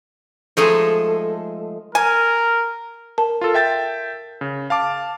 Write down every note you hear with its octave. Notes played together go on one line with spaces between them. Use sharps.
F3 G#3 A3 D#4 G#4 A4
A#4 G#5
A#4 A5
F4 A4
E5 G5 A6
C#3
F5 A5 D6